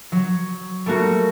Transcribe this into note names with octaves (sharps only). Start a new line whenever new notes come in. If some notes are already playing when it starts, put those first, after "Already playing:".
F#3
G3 A3 A#3 F#4